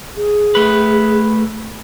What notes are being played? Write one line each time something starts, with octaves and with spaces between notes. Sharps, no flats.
G#4
A3 B4